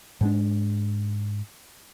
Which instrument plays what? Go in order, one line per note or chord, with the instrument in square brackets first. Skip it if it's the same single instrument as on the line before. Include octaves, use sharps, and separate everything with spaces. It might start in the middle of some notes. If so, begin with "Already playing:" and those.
[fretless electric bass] G#2 G#3 D4